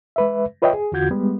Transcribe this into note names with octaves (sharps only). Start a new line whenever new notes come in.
G#3 B4 E5
F4 B4 C#5 D#5 E5 G5
G#4
E2 D3 F4 F#4 G6 G#6
G3 G#3 B3